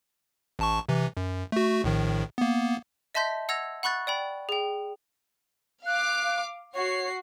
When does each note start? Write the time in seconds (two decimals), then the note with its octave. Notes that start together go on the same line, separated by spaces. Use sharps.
0.59 A1 A5 C#6
0.89 C3 E3
1.17 F#2
1.52 A3 F#4
1.84 A#1 A2 D#3
2.38 A#3 B3
3.15 D#5 E5 A5 C6 G6 B6
3.49 F#5 E6 G#6 A#6 F7
3.83 F#5 B5 C#6 F#6 A6
4.07 D5 G5 B5
4.49 G#4 G5
5.86 F5 D6 F#6
6.74 F#4 C#5 C7